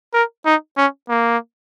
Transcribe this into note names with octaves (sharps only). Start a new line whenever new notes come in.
A#4
D#4
C#4
A#3